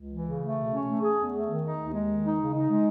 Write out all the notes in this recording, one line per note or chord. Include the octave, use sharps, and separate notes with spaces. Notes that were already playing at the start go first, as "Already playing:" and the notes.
Already playing: C#2
E3
C#3
A3
B2
C#4
A3
G#4
E2
A3
D#3
D#4
D#2
G#3
D#3
D#4
C#3
D#4
G#3